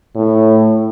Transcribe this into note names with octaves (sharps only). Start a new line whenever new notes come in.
A2